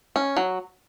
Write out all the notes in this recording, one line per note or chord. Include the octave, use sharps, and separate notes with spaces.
C#4
F#3